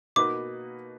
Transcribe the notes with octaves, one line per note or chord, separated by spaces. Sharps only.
B2 A#3 D#4 F#4 B4 D6